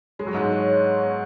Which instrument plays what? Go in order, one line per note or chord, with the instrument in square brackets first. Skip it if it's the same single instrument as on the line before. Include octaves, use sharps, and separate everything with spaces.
[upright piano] G#3 [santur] C#5
[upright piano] F#3
[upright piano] G#2 G#3 [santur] E5
[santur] C#5
C#5
B3
C#5